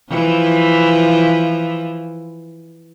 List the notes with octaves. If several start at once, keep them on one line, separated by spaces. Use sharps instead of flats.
E3 F3